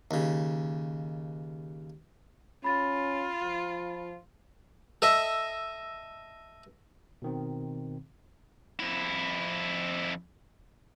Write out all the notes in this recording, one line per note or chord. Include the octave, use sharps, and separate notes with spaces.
D#2 C#3
C#4 F4 B5 A6
F3
A4 D#5 E5
B2 D#3 C4
F2 E4